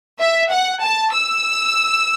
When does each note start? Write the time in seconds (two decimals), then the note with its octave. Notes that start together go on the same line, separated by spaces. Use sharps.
0.20 E5
0.51 F#5
0.83 A5
1.14 E6